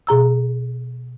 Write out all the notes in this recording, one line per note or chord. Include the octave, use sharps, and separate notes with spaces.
B2 G#4 A#5 E6